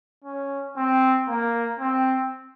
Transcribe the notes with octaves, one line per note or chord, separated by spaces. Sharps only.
C#4
C4
A#3
C4